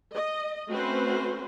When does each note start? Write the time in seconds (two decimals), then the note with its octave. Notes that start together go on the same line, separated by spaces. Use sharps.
0.14 D#5
0.70 A3 C4 C#4 F#4 B4 C5